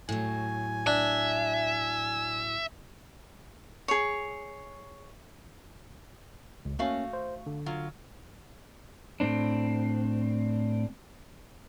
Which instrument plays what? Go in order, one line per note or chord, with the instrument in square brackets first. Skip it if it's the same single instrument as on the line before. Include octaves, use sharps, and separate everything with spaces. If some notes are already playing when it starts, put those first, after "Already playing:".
[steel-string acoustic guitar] A2 F#3 [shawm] G#5
[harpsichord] D4 [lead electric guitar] E5
[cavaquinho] G#4 C#5
[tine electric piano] C#2
[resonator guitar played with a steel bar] A3 F#4 F5 [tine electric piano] A#3 C#4
[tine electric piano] C5
D3
[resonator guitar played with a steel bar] F#3 F4
[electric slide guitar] A2 C4 D4